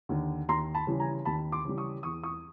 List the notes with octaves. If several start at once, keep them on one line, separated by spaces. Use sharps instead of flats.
D#2 D3
D#2 A#5 C6
A5 B5
C#3 E3 G3
G#5 A#5
D#2 A5 B5
C6 D6
C#3 E3 G3
C#6 D#6
E2 C#6 D#6
C#6 D#6